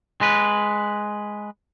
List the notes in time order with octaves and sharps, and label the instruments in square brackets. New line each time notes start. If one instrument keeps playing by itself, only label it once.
[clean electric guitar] G#3 B4